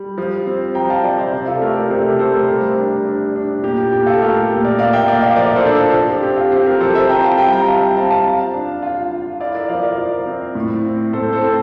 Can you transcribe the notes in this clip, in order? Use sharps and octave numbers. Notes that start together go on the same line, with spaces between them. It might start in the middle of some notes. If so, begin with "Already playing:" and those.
Already playing: G3
F3
C4
F3 G5 A#5
F5 A5
F3 D5 F5
C5 E5
C3
F4 A4
A3 G4 A#4
A#4 D5
C3 A4 C5
G4 A#4
A3 A4 C5
A4 C5
G3 G4 A#4
D4
D4
D4
A#2 G4
G4
A#2 G4
F4 A4
A3 G4 A#4
A#2
A#4 D5
A#3 D5 F5
E5 G5
A#3 D5 F5
D5 F5
F3 A#4 D5
A4 C5
D4
A4 C5
F3
G4
C4 G4
F4
C4 G4
G4 A#4
F3 A4 C5
C5 E5
C4 G5 A#5
F5 A5
G3 E5 G5
G5 A#5
C4 F5 A5
C4 F5 A5
F5 A5
F4
D4
F4
F4
E4 D5 F5
A#4 D5
F3 D5 F5
A#4 D5
F3
C4
A2
C4
A2 A4 C5
A4 C5
C4